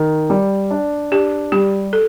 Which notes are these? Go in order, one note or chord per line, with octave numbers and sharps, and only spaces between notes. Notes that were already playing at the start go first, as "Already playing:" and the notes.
Already playing: D#3
G3
D4
D4 G4
G3 G4
A4